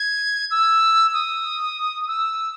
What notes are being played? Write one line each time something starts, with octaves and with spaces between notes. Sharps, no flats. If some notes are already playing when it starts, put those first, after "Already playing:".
Already playing: G#6
E6
D#6
E6